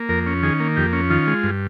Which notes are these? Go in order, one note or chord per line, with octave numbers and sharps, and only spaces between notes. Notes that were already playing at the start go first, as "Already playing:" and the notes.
Already playing: A#3
F2 A#4
C#4
D#3 G#4
A#3
F2 G4
C#4
D#3 F4
G#3
G2